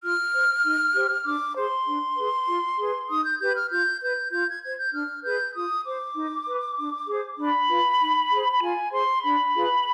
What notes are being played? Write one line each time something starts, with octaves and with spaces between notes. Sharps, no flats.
F4 F6
C5
D#4
G4 C5
D4 D6
G#4 C5 C6
D4
G#4 B4
F4
G#4 B4
D#4 D#6
G6
G4 B4 G6
F6
F4 G6
B4 G6
F4 G6
G#6
C5 G#6
G6
D4 F6
G#4 B4 G6
F4 D#6
C5 D6
D#4
B4
D4
G#4 C5
D4 B5
F4 B4
D#4
G#4 C5
B5
F4 G#5
G#4 C5 C6
D4 B5
F4 G#4 B4